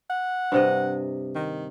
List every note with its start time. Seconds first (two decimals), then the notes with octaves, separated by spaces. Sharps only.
0.10 F#5
0.52 G2 C3 D#5
1.35 D#3